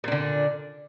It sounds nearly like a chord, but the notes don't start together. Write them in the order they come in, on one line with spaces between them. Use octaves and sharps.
A#2 D4 D3